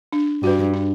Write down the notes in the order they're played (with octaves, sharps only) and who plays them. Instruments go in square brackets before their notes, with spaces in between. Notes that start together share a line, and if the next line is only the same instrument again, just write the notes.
[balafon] D4
[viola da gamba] G2 [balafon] F#4 B4
[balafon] D4